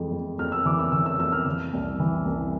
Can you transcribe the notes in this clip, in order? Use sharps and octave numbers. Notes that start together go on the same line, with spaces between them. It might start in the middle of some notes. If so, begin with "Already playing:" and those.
Already playing: F2 E3 G#3
F2
F2 F6
E6
E3 D6
E6
E3 E6
E6
F2 E6
F6
E3
C2
E3
C2